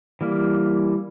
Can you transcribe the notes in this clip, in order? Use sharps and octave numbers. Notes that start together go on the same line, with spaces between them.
E3 G3 A#3